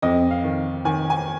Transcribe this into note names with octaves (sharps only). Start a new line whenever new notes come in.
F2 D#5
F5
D#3
D#3 G#5
G#5